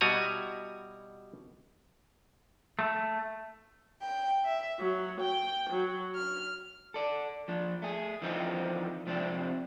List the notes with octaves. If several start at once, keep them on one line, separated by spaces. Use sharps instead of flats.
B2 G3 E4 F#4 G#5 A#5
A3
G5
E5
F#3
G5
F#3
F6
A4 D5
F3 D4
A3 G#4
D3 E3 F3 C4 D#4
C3 F3 C4 D4